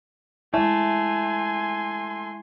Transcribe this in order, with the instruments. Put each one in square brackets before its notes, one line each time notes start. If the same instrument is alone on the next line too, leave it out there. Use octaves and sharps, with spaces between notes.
[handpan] G#3 E4 [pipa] A3 [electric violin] G#5 C6